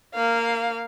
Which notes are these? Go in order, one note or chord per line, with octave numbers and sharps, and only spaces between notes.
A#3 F5